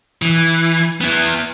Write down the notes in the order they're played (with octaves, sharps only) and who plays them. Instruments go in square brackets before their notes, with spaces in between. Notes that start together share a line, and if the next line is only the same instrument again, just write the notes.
[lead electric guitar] E3
B3 E4